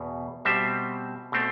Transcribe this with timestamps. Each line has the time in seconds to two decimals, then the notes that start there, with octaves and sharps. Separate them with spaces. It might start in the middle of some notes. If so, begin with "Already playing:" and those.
Already playing: E2 B2
0.45 B2 G3 C4 C5 E5
1.32 B2 A3 C4